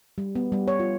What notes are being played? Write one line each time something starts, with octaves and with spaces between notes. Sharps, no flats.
G3
B3
G3
C#5
F4